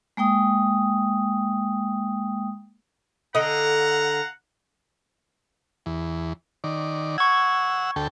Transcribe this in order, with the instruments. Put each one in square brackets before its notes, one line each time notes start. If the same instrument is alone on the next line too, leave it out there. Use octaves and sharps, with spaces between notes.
[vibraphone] G#3 A#3 G5 D#6
[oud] D3 D#5 [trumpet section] F5 F#5 A#5
[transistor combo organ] E2
D#3 D5
[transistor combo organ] F#5 E6 [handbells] C#6 G#6
[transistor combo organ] D2 A4 G5